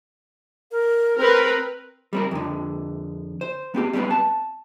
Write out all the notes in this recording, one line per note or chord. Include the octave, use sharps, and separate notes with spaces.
A#4
C4 A#4 B4
G3 C4 A#4
F2 D3
C5
B3 C4 G4
G3 B3 C4 A#4 B4
A5